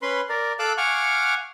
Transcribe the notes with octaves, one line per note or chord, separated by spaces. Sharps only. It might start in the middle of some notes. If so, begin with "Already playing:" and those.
C#4 B4 B5 C6
A#4 D5
A4 F5 D6 E6 F#6
F5 F#5 G#5 C#6 D6 F6